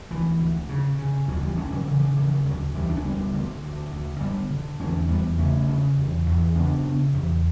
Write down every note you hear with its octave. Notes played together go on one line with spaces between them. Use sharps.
D2 E3
D2
C#3
C#3
D2 D3 F#3
E3 G3
D2 A3 C#4
D3 F#3
C#3 E3
D3
C#3 E3
D3 F#3
D2 D3 F#3
D2 E3 G3
D4
C#4
D3 G3 B3
D3
D2
D2
D3 G3 B3
D3
E2 A3 C#4
E2 G3 B3
C#3 A3 C#4
C#3
E2
E2
C#3 B3 D4
C#3
E2